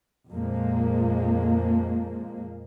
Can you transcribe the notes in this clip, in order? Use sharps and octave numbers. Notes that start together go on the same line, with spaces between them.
F2 A#2 F3 G#3 A#3